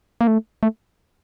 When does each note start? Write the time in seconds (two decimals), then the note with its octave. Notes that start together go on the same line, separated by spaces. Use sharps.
0.21 A#3
0.27 A3
0.63 A3